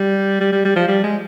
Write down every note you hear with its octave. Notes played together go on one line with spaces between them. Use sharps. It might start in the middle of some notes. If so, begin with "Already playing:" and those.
Already playing: G3
G3
G3
G3
F3
G3
G#3